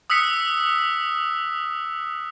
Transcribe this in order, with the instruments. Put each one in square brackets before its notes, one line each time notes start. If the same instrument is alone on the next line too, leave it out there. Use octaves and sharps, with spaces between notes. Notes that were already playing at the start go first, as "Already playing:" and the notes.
[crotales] D#6 E6 F#6 B6 C#7